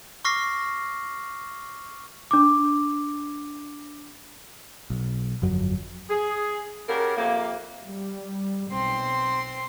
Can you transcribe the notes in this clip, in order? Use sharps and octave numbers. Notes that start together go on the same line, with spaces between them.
C#6 D6 F6 A#6 C7
D4 D6
B1
G1 F2 F#3
G#4
C#3 F#4 G4 A#4
F2 C3 A#3
G3
B1 C4 C6